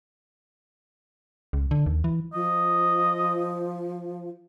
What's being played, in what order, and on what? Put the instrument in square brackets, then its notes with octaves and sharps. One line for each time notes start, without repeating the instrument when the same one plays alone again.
[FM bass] C#2
D3
D#2
E3
[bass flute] F3 [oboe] D#5